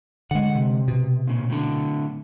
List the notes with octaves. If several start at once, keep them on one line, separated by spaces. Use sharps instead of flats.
D3 G#3 F#5
C3
B2
A#2 C#3
A2 D3